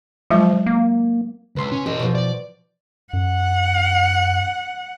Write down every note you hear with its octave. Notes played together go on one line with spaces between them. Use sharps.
F3 F#3 G#3 F4
A#3
C#2 B4 C6 E6
C#4
E1 G4 D#5
B2 F3
D5
F#2 F#5